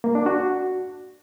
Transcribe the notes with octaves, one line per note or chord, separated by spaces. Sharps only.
A#3
D4
F#4